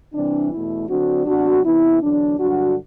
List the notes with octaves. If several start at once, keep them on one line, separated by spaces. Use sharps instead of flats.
C3 E3 G3 C4 D4
E2 B2 A3 E4
D3 F#3 C4 D4 F#4
C3 F#3 B3 D4 F#4
C3 E3 B3 E4
E2 D3 F#3 D4
G2 D3 F#3 D4 F#4